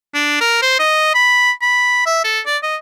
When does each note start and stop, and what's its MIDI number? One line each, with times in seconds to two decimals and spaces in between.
0.14 0.37 62
0.41 0.60 70
0.62 0.78 72
0.79 1.12 75
1.15 1.51 83
1.61 2.04 83
2.06 2.23 76
2.24 2.40 69
2.46 2.57 74
2.63 2.76 75